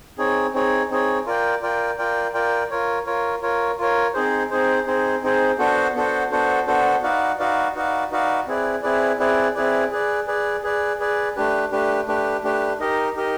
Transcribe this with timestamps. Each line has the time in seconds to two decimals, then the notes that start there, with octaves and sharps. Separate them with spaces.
0.18 C4 D#4 G#4 C#5
0.53 C4 D#4 G#4 C#5
0.90 C4 D#4 G#4 C#5
1.26 F4 A#4 D5 G5
1.62 F4 A#4 D5 G5
1.98 F4 A#4 D5 G5
2.34 F4 A#4 D5 G5
2.70 F4 A#4 C#5
3.06 F4 A#4 C#5
3.42 F4 A#4 C#5
3.79 F4 A#4 C#5
4.14 C4 D#4 G#4 C5
4.51 C4 D#4 G#4 C5
4.87 C4 D#4 G#4 C5
5.23 C4 D#4 G#4 C5
5.59 B3 D4 F#4 A4 C5
5.95 B3 D4 F#4 A4 C5
6.31 B3 D4 F#4 A4 C5
6.67 B3 D4 F#4 A4 C5
7.03 D#4 F#4 B4 D5 F5
7.39 D#4 F#4 B4 D5 F5
7.75 D#4 F#4 B4 D5 F5
8.11 D#4 F#4 B4 D5 F5
8.47 C4 E4 G#4 B4 D5
8.83 C4 E4 G#4 B4 D5
9.19 C4 E4 G#4 B4 D5
9.55 C4 E4 G#4 B4 D5
9.91 G#4 B4 D5
10.28 G#4 B4 D5
10.63 G#4 B4 D5
11.00 G#4 B4 D5
11.36 A3 D4 G4 B4
11.71 A3 D4 G4 B4
12.07 A3 D4 G4 B4
12.44 A3 D4 G4 B4
12.80 D#4 G4 A#4 D#5
13.16 D#4 G4 A#4 D#5